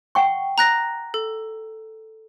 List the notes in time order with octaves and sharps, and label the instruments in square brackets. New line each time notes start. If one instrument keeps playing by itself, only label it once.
[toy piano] F#5 G5 C#6
[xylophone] A#5 F#6 A#6
A4